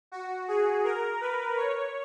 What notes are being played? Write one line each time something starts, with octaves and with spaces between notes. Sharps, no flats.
F#4
G#4
A#4
B4
C#5